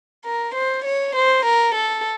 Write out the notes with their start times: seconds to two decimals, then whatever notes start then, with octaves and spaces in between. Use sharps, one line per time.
0.25 A#4
0.54 C5
0.85 C#5
1.16 C5
1.45 A#4
1.75 A4